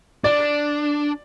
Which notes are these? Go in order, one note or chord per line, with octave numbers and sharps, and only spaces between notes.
D4 D5